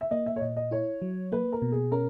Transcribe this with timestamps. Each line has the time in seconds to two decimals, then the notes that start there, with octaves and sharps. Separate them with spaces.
0.01 E5
0.11 A#3 D#5
0.26 E5
0.36 C#5
0.41 A#2 D#5
0.57 D#5
0.71 E4 C#5
1.02 F#3
1.32 A#3 B4
1.52 A#4
1.62 B2
1.72 G#4
1.92 C#4 A#4